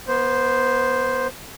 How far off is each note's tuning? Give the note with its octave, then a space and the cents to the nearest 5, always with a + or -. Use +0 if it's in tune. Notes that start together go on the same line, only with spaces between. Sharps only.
B3 -25 C5 +0